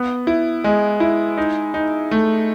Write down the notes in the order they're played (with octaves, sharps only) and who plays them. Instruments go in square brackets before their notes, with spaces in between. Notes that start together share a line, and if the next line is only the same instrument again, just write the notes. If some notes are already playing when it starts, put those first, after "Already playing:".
Already playing: [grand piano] B3
E4
G#3
E4
D#4
D#4
A3